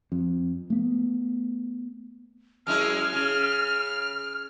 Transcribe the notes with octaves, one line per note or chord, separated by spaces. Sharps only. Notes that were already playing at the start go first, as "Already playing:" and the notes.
F2
A3 B3
F#2 G#3 E4 F6
C#3